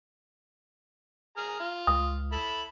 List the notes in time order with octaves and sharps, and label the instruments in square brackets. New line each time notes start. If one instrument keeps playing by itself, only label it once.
[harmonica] G#4 A#5 F6
F4
[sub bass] C#2 [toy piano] D#6
[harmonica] E4 A4 B5